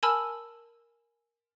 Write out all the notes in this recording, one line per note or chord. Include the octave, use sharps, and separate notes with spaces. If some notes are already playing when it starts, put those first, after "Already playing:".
A#4 G#5 A5 B5 E6 F6